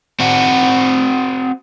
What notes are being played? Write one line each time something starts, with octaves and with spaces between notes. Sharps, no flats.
C4 F#4